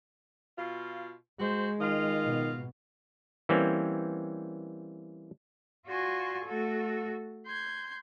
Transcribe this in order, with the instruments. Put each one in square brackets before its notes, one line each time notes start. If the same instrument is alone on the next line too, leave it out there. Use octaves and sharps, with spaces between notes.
[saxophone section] B2 F4
[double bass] G#3 [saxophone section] F#4 C5
[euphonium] D#3 [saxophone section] F4 D#5 F5
[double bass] B2
[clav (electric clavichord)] E3 G3 A#3 C4 C#4
[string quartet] F4 F#4 D5 G#5 C6 C#6
A3 F#4 A4
C6 G6 G#6